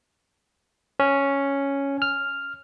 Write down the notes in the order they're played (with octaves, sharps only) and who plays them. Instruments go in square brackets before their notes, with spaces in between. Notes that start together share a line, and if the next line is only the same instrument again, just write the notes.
[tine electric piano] C#4
F6